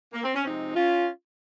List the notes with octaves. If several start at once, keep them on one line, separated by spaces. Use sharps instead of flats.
A#3
C4
C#4
C3 F3 G#3 C4 D#4
C#4 F4